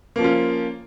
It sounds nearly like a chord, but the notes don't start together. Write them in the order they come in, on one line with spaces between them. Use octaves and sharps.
A#3 F3 C#4 F4